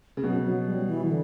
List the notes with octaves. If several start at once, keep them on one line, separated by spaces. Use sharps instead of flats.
C#3
B2 F#3
F#3
G3
E3
D3